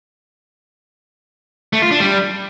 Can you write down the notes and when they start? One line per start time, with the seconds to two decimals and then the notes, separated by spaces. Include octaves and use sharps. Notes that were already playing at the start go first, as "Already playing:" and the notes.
1.73 A3
1.82 F4
1.91 D4
2.00 G3